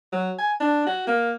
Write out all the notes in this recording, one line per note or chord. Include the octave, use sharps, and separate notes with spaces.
F#3
G#5
D4
F#4
A#3